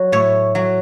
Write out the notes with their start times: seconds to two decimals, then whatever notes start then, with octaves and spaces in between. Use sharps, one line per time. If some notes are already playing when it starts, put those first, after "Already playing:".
Already playing: F#3
0.12 A2 C#5
0.55 F#3